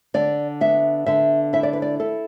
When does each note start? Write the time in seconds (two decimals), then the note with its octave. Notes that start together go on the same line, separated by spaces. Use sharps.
0.14 D3 D5
0.61 B3 E5
1.06 D3 E5
1.53 E4 E5
1.63 D5
1.73 B4
1.82 D5
2.00 E4 A4